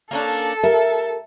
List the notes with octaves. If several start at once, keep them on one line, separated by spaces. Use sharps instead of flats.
A#3 C#4 D4 A4
G4 A#4 E5